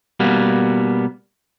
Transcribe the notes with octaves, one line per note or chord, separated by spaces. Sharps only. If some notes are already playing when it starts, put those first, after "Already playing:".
B2 G3 A#3 B3